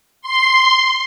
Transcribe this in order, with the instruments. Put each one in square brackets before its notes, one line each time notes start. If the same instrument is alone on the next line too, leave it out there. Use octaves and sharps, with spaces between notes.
[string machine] C6